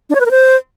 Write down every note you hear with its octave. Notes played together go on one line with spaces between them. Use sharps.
D4
C#5
B4
A#4
C5